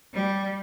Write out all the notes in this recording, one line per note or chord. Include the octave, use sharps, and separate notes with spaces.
G3